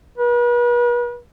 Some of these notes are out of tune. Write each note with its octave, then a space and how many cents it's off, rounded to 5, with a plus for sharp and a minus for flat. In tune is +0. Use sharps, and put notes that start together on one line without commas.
B4 -40